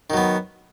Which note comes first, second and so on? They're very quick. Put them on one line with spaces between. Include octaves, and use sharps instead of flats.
D#3 F#3 B3